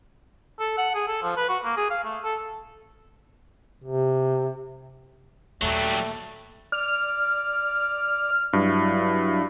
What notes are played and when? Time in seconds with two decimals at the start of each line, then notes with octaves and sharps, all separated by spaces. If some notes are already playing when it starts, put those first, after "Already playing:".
0.60 A4
0.78 F#5
0.95 G#4
1.08 A4
1.23 F3
1.37 B4
1.49 F#4
1.64 A#3
1.77 G#4
1.90 F5
2.04 A3
2.24 A4
3.84 C3
5.61 D#2 A#2 F#3 G3 A3
6.72 D5 F6
8.53 G2 F#3 E4